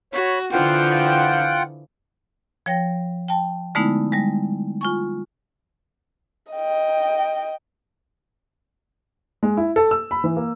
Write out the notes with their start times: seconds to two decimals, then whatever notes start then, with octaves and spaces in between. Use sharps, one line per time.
0.13 F#4 C#5 B5
0.52 D3 E3 F3 F4 F#5 G5
2.66 F3 C#5 G5 A#6
3.28 G5 A5
3.75 D3 G#3 A3 B3 D#4 E4
4.12 G3 G#3
4.81 F4 G#5 C#6
6.53 D#5 G5
9.43 G#3
9.57 E4
9.76 A4
9.91 E6
10.11 B5
10.24 E3
10.36 A#3